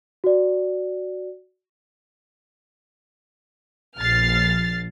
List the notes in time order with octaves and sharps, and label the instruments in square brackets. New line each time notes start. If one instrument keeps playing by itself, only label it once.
[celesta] F#4 D5
[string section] A#1 [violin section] F6 A6 C7